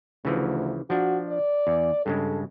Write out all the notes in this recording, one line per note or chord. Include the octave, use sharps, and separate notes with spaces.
D2 C#3 E3 F3
F3 D4 F#4
D5
E2
G2 C#3 G#3 A4